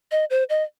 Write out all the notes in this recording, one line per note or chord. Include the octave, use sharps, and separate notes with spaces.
D#5
C5
D#5